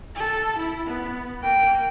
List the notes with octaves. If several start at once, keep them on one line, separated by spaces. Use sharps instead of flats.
A4
E4
B3
A#3 G5